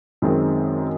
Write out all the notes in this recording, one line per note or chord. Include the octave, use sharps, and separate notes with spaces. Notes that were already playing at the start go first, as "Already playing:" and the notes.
F#2 D#3 G#3 C4